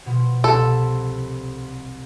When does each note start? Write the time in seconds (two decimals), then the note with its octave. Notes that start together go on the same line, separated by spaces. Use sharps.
0.06 B2 F3
0.44 C2 A4